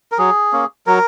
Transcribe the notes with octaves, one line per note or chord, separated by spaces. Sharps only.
A#4
F#3 G#4
A#3 C#4
F#3 A#4